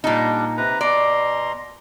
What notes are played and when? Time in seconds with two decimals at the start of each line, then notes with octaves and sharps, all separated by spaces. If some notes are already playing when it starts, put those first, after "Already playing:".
0.04 A#2 G3 D4 D#4
0.57 C3 B4 A#5
0.81 B2 D5 A#5 C6